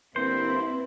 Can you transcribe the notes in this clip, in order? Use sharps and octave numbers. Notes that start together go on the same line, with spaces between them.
D3 G3 A#3 C4 E4 B4 C5